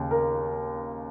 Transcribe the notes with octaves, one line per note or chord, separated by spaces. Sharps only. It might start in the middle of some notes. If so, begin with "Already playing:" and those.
Already playing: D#2 C#3
A#4